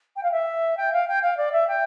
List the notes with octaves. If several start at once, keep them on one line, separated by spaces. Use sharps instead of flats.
G5
F5
E5
G5
F5
G5
F5
D5
E5
G5